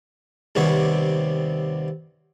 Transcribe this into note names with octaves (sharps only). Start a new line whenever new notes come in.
D#2 C3 G3 B3 C4 C#5